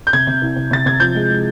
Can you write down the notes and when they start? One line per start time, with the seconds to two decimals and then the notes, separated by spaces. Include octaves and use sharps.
0.07 G6
0.13 C3 G#6
0.27 C3
0.42 C2
0.56 C3
0.71 C3 A6
0.86 C3 G#6
1.00 F3 G6
1.15 G#3
1.30 G#3